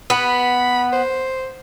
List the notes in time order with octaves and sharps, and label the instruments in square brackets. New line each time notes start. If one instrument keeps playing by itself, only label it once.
[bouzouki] B3 [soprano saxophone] B5
[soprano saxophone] C5